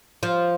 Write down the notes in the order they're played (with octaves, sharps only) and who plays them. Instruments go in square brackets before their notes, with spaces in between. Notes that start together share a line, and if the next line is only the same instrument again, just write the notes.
[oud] F3